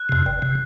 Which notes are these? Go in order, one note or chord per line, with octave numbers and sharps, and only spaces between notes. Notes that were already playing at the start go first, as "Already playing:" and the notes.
Already playing: F#6
F2 C3
G1
C3